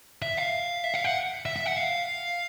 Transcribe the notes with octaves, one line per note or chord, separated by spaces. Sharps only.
E5
F5
E5
F5
F#5
E5
E5
F#5
F5